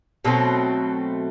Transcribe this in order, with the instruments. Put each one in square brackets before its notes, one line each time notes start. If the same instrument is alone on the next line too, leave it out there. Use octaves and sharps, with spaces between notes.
[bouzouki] B2 F#3 A3 C4